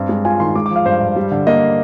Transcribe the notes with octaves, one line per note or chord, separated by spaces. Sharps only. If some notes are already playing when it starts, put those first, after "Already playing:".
Already playing: G2 C4
G#3
F4 G#5
D#3 C6
G#3 D6
F3 D6
F5
G2 C5
G2
G3
D3
A#3 D#5